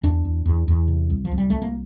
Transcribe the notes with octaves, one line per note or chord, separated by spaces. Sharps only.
E2 D4
E2
E2
E2
C3
C2
F3
C2
G3
C2 A3
A#3